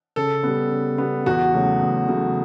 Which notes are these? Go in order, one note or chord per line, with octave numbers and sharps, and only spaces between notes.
C#3 A4
G3 B3
C#3
G3 B3
E2 F#4
C#3 F#3 A3
E2
C#3 F#3 A3